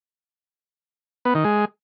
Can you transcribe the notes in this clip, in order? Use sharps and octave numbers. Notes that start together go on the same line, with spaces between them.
B3
D#3
G#3